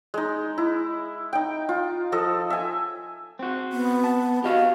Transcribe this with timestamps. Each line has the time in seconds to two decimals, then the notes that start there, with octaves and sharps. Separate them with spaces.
0.14 G#3 D#4
0.58 E4
1.33 D#4 G5
1.69 F4
2.12 F3 A4 D#5
2.50 E5 G#5
3.39 C4 F#4
3.73 B3
4.04 A5
4.44 F#4 G4 D#5 F5